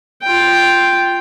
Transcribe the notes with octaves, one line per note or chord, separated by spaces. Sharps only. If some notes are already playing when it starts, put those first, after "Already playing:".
F4 G5